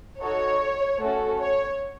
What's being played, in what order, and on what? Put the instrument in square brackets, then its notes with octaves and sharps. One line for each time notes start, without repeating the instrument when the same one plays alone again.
[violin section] D#4 F#4 A4 C#5
A3 C#4 F#4 A4
C#5